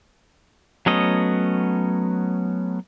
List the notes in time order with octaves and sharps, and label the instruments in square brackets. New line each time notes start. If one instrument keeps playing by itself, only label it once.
[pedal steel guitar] F#3 A3 B3 C#4 D#5